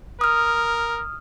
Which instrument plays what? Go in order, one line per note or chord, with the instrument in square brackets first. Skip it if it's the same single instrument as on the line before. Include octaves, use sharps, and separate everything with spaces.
[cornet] A#4 [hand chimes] D#6 F6